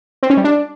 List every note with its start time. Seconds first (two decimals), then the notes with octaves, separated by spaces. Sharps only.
0.23 C4
0.30 C#4
0.37 G3
0.44 D4